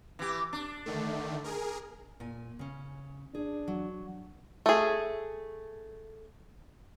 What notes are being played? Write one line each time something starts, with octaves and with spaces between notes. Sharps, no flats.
E3 G4
D4
D3 D#3 A3
G#4 A#4
A#2 G#5
C#3 C#4
D4 G#4
F#3
A3 G#4